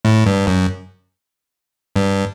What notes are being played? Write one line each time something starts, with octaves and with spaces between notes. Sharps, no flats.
A2
G2
F#2
G2